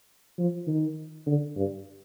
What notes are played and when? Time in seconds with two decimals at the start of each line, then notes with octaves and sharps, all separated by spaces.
0.39 F3
0.67 D#3
1.27 D3
1.56 G2